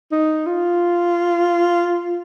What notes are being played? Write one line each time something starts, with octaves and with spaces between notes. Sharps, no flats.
D#4
F4